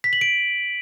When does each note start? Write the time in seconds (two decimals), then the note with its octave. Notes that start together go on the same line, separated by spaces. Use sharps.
0.04 B6
0.13 F#7
0.21 D7